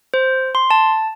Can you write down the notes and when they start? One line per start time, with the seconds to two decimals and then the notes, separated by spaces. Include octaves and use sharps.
0.14 C5
0.55 C6
0.71 A5